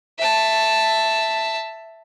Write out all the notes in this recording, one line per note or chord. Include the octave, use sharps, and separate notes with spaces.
E5 A5